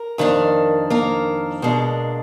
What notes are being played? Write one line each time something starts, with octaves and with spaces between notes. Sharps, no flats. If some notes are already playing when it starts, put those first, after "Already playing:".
Already playing: A#4
F2 D#3 A#3 D4
A#3 A#4
B2 G#3 D4